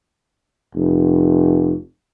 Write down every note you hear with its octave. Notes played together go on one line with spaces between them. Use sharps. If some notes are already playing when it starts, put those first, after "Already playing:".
F1